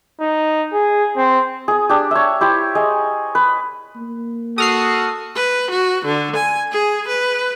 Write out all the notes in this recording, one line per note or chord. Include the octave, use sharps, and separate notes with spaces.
D#4
G#4
C4
G#4 D#6
D4 G4
C#5 E5
E4 G4 C5 C#5
G#4 D#5
B4
A#3
F#4 A4 D#6 F6 C7
B4
F#4
D3
G#5
G#4
B4